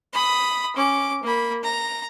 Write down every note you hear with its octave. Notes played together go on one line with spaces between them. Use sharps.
B5 D#6
C#4 D6
A#3 B5
A#5